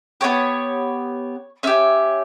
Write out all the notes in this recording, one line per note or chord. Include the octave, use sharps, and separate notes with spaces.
B3 D#4 G4 C#5
C#4 G4 E5